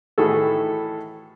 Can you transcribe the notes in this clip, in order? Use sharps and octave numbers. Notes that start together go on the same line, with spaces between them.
A2 D#3 E3 F#4 G#4 A4